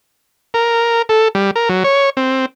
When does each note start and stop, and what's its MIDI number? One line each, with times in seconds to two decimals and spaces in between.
0.54 1.02 70
1.09 1.28 69
1.35 1.51 55
1.56 1.69 70
1.69 1.83 54
1.84 2.10 73
2.17 2.46 60